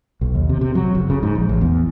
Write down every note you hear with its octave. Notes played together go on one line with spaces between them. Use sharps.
B1
D#2
C3
C3
F#3
F#1
C#3
G#2
A#1
A1
E2